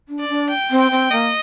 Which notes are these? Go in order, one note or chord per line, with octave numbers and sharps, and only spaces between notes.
D4
D5
D4
G5
C4
G5
C4
A#3 D#5